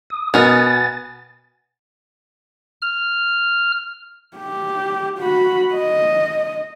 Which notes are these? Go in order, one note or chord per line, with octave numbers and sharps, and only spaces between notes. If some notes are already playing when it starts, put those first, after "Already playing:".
D#6
B2 B3 A#4 D#5 G#5 A6
F6
G4
F#4 B5
D#5